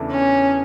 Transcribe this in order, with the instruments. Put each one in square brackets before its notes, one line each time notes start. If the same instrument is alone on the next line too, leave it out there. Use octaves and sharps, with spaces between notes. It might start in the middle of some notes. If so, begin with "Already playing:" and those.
Already playing: [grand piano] E2 C#3 E3 A3 D4
[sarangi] C#4